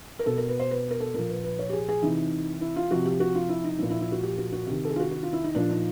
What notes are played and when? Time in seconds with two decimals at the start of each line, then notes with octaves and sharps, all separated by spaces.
0.19 A#4
0.26 B2 A4
0.38 A#4
0.48 B4
0.60 C5
0.71 B4
0.91 A#4
1.00 A4
1.14 A#2 F3 A#4
1.29 B4
1.44 B4
1.59 C#5
1.69 G4
1.73 G#4
1.89 G#4
2.02 C3 E3 D#4
2.61 E4
2.76 F4
2.91 C3 F3 F#4
3.05 G4
3.20 F#4
3.35 F4
3.49 E4
3.64 D#4
3.79 F3 E4
3.83 A#2
3.90 E4
4.01 E4
4.12 F#4
4.23 G4
4.38 F#4
4.52 F#4
4.67 C3 D#3 G4
4.85 A4
4.90 G#4
4.96 F4
5.00 F#4
5.11 F#4
5.23 F4
5.33 E4
5.44 D#4
5.55 A#2 F3 D4
5.71 D#4